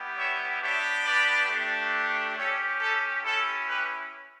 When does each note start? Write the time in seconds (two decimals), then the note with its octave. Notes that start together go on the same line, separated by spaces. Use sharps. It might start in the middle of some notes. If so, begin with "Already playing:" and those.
Already playing: G3 B3 E4 G4
0.17 C#5 E5
0.61 B3 D4 G4 C#5 E5
1.04 B4 D5
1.48 A3 D4 G4
2.36 C#4 G4 A4 C#5
2.80 A4
3.24 C#4 E4 G4 A4
3.67 G4 B4